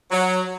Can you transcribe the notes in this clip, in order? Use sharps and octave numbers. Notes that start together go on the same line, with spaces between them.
F#3